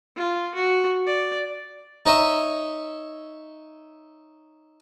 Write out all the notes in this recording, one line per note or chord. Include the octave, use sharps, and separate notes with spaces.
F4
F#4
D5
D#4 C#5 D#5 E5